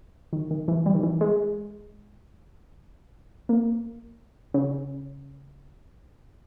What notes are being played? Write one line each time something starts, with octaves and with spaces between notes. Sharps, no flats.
D#3
D#3
E3
G3
D#3
E3
G#3
A#3
C#3